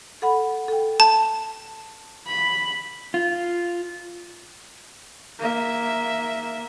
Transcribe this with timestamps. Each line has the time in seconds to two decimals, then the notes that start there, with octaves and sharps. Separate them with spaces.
0.22 A4 F#5 B5
0.68 A4 G5
1.00 A5
2.27 B5
3.14 F4
5.39 A#3 E5